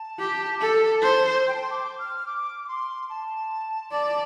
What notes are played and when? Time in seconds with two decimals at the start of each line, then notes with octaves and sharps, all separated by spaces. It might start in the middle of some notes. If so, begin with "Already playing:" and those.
Already playing: A5
0.19 G4
0.61 A4
1.02 C5
1.48 G5
1.55 A5
1.63 C6
1.71 D6
1.99 F6
2.26 D6
2.64 D6
2.68 C6
3.10 A5
3.91 D5